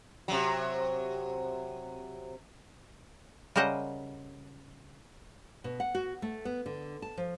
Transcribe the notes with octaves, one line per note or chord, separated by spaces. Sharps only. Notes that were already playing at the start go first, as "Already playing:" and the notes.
C3 F#3
C#3 G3 A#4 C5 D#5 F#5
B2
F#5
F#4
A3
B3
D3
A5
F3